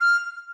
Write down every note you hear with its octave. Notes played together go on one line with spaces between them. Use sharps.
F6